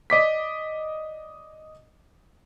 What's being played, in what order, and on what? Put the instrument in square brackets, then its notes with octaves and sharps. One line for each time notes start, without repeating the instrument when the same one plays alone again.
[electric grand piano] D5 D#5 D6 B6